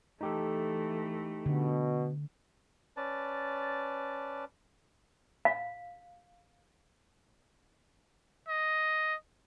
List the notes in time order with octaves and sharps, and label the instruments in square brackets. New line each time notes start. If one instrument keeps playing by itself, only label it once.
[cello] E3 A3 [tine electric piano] D#4 G4 A4
[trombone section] B2 [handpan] D3
[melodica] C#4 B4 D5 A5
[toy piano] F5
[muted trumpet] D#5